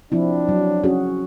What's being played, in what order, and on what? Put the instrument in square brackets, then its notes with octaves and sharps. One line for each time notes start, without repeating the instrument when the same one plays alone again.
[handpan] F3 C4 E4 [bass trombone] D4
[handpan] F#3
C#4 F#4 G#4